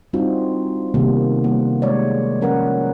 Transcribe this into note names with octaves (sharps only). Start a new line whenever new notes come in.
G3 C4 D4 D#4 F4 F#4
C3 D#3 G3 A#3 B3
G3 A#3 F#5
G#3 C#5 D5
F3 C#4 A#4 B4 F#5